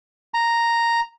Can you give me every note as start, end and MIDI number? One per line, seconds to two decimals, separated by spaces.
0.34 1.00 82